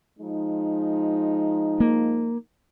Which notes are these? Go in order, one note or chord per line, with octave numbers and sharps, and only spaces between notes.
F3 G#3 D#4
A#3